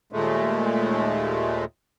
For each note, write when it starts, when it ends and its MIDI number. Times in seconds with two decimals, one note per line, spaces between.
0.13 1.65 39
0.13 1.65 46
0.13 1.65 56
0.13 1.65 57